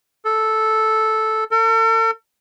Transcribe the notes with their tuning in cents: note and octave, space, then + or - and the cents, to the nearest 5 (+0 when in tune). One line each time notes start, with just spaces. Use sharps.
A4 -5
A4 +45